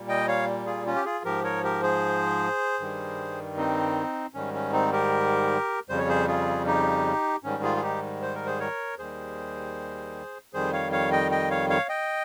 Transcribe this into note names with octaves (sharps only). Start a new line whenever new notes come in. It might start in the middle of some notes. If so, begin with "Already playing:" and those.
Already playing: A#2 G3
D#5 G5
C#5 F5
F4 G#4
C#4 F4
G4
F4 G#4
G#2 F3 G4 A#4
A#4 C#5
G4 A#4
G#4 C5
G2 D#3 G3
C4 D#4
G#2 D#3 G3 C#4
C#4
C4 D#4
G4 A#4
F2 C#3 G3 C5
C#5
G#4 C5
F4 G#4
D#4 G4
G#2 D#3 G3 C#4
F4 G#4
G#4
D#4 G4
C5
A#4
G#4 C5
A#4 C#5
D#2 D#3 G3 G#4 C5
F2 D#3 G3 G#4 C5
C#5 F5
C#5 F5
D#5 G5
D#5 G5
C#5 F5
C#5 F5
D#5 G5